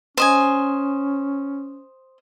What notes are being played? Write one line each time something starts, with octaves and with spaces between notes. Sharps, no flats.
C#4 C5 D#5 G#5